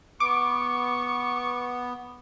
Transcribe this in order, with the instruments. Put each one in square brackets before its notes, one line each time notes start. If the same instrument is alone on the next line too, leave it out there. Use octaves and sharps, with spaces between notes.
[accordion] B3 [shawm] C#6 [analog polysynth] D6